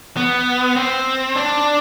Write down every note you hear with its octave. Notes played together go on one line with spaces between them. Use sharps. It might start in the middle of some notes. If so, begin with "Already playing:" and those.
B3
C4
D4